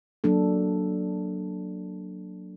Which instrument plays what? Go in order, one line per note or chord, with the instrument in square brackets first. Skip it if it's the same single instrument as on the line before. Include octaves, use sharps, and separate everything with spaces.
[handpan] F#3 A#3 D4 A4